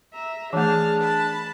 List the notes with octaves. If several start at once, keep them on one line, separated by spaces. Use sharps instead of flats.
E5 A#5
E3 A3 D4 G#4 A5 F6
A5 B5